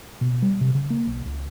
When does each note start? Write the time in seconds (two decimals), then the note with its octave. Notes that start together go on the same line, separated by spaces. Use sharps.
0.21 B2
0.42 G3
0.61 C3
0.75 C#3
0.90 A#3
1.07 B1
1.25 C#2